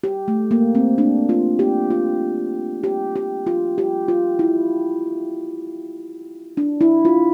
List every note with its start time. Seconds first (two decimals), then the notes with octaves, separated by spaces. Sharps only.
0.04 G4
0.28 A3
0.51 A#3
0.75 C4
0.98 D4
1.29 F4
1.59 G4
1.90 F4
2.84 G4
3.16 G4
3.47 F4
3.78 G4
4.08 F4
4.39 E4
6.57 D4
6.81 E4
7.05 F4